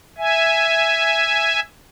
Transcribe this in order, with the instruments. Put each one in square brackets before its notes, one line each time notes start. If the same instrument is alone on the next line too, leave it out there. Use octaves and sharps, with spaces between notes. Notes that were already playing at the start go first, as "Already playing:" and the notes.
[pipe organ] E5 G#5